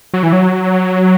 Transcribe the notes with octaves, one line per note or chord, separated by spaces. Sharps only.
F#3
E3
F#3